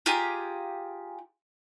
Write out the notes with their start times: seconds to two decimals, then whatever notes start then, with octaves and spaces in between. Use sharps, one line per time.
0.06 F4 G4 G#4 A#5